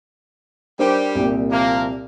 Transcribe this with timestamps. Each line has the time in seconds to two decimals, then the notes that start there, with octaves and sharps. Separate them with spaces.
0.79 G3 D4 G4 A#4 C5
1.15 C2 A#2
1.50 C3 F3 A#3